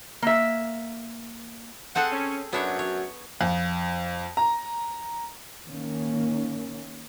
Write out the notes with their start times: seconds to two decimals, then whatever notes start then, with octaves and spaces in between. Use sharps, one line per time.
0.22 A#3 E5
1.96 C4 G#4 A4 F#5
2.12 C#4
2.53 F#2 F#3 B3 D4 F#4 C#5
2.79 C#5
3.41 F2
4.37 A#5
5.67 D#3 A#3 C#4